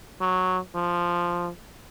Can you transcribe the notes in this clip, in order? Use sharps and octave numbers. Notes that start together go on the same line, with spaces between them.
F#3
F3